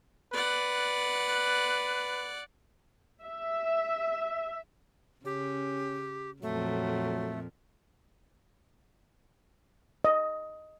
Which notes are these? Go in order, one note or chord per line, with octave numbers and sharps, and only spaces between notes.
B4 D5 F#5
E5
C#3 C#4 G4
F2 A#2 F#3 A3
D#5